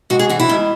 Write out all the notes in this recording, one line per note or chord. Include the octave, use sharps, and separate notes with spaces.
G#2 F#4
G#4
E3 F#4
E4
G#2